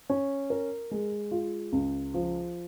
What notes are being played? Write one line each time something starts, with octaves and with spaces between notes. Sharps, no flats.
C#4
A#4
G#3
F4
C#2
F3